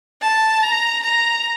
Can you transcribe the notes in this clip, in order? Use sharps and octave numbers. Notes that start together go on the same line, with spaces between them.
A5
A#5
A#5